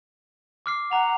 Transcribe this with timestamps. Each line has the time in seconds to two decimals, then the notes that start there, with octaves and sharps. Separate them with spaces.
0.66 D6 F6 C7
0.92 F#5 A#5 F7